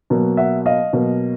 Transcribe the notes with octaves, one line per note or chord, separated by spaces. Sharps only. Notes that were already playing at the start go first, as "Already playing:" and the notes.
B2 F#3 A#3
E5 F#5
D#5 F5
B2 F#3 A#3